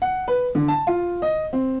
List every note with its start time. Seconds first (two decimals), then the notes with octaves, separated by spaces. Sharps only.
0.02 F#5
0.28 B4
0.55 D3
0.68 A5
0.87 F4
1.22 D#5
1.53 C4